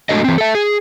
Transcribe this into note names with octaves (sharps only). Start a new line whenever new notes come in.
G#3 A3 D4 F#4 A4 D#5
E3 C4
A4 E5
G#4